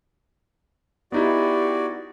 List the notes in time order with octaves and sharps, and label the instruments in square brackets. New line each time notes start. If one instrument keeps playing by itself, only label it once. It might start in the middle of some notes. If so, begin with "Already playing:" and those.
[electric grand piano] B3 D#4 E4 [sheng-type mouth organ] F#4 D5 [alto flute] G4